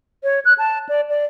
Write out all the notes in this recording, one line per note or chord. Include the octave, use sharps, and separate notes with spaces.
C#5
F#6
A5
D5
D5